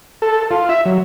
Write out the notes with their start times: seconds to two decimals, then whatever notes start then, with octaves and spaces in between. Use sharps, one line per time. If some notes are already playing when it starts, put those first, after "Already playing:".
0.22 A4
0.51 F4
0.69 E5
0.85 F#3